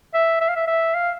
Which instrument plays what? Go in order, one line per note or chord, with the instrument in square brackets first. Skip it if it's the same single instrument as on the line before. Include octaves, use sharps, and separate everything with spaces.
[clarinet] E5
E5
F5
E5
E5
F5